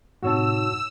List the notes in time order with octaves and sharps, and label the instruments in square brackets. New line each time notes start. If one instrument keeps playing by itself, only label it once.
[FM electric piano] A2 C3 [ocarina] D#4 [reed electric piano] F#4 C#5 A5 [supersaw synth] E6